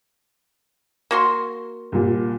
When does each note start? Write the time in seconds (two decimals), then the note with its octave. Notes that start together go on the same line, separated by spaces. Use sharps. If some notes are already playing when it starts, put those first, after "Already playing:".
1.11 A#3 F#4 C6
1.92 C2 A#2